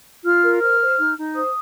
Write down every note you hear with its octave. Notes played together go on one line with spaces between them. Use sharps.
F4 F6
A#4
C5 F6
C5
D#4
D#4
C5 D#6